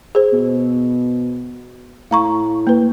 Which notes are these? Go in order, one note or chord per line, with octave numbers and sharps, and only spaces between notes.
G#4 C5
B2
A2 F5 A#5 C#6
A#3 B4